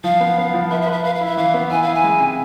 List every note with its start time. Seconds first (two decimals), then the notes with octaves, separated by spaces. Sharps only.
0.04 F3 F5
0.20 B3
0.38 B3
0.54 F3
0.71 B4 E5
0.82 E5
0.87 B4
0.93 E5
1.04 B4 F5
1.15 F5
1.21 E4
1.26 E5
1.37 E3 F5
1.54 B3
1.71 E4 G#5
1.83 E4 F5
1.94 G#5
2.04 G#3
2.20 C3